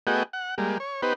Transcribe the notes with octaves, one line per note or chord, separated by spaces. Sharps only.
A3 B3 F#4 G#4 D#5 G5
F#5
G3 G#3 A#3
C#5
B3 D#4 G4 B4 C5